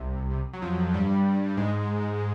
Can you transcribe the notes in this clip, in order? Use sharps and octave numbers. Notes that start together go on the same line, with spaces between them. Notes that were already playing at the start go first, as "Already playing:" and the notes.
Already playing: C2 C3
C2 C3
F#3
F2 F3
G2 G3
G#2 G#3